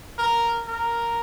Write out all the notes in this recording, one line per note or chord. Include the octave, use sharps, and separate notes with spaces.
A#4
A#4